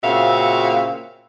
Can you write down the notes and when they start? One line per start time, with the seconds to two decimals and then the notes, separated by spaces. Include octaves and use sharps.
0.04 A#2 C#3 C4 F#4 E5 F5